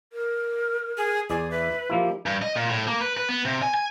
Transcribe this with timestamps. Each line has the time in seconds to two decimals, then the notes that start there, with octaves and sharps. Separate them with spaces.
0.13 A#4
0.97 G#4
1.30 E2 G#4 D5
1.51 B4 E5
1.90 F3 A#3 E4 G4
2.26 G2
2.42 D#5
2.56 A#2
2.69 A2
2.87 A#3
3.01 B4
3.17 B4
3.29 B3
3.45 C3
3.62 G#5
3.74 G#5